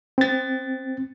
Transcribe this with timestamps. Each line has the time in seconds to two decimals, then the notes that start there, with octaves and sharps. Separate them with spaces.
0.18 C4 A6